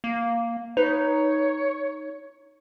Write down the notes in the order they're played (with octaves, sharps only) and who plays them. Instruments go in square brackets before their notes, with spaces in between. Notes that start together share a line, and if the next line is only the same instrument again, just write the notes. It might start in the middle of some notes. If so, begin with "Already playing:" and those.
[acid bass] A#3
[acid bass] D#4 [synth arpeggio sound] B4 [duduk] C#5